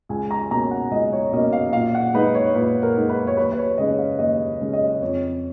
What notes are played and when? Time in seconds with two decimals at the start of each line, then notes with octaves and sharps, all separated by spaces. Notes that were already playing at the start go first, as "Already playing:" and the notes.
0.09 C#2 G#5
0.31 A#5
0.51 B2 A#3 C#4 A#5
0.71 F#5
0.91 C#2 D#5
1.12 C#5
1.32 B2 A#3 C#4 D#5
1.53 F5
1.73 A#2 F5
1.95 F#5
2.14 G#3 D#4 B4
2.35 C#5
2.55 A#2 B4
2.83 A#4
2.97 G#3 D#4
3.09 B4
3.27 C#5
3.37 D#2 B4
3.52 B4
3.58 C#5
3.78 C#3 G#3 C#4 D#5
3.98 F5
4.19 D#2 D#5
4.61 C#3 G#3 C#4
4.73 D#5
5.02 F2 C#5